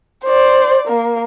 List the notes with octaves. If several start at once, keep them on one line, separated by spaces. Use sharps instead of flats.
C5 D5
A#3